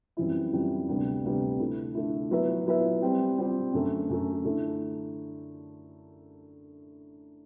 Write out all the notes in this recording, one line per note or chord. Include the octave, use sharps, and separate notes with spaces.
F#2 E3 G3 C4 E4
F#2 E3 G3 C4 E4
D2 C3 G3 B3
D2 C3 G3 B3
D3 A3 E4
D3 A3 E4
F#3 B3 E4 B4 E5
F#3 B3 E4 B4 E5
G3 C4 G4
G3 C4 G4
F#2 D3 A3
F#2 D3 A3
D3 A3 E4